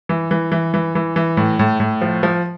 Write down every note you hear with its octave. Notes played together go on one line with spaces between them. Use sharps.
E3
E3
E3
E3
E3
E3
A2
A2
A2
F3
F3